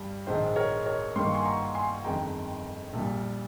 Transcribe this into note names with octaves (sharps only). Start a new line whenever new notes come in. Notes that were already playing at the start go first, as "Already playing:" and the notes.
Already playing: G2 G3
A#1 G#2 D#3 G#3 C5
A#4 C#5
A#4 C#5
G2 D#3 A#3 C6
C#6
G#5 C6
A#5 C#6
G#5 C6
G1 F2 D#3 G#3 G5 A#5
A#1 A#2 G3